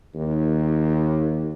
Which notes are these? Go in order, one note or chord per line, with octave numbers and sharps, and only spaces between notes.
D#2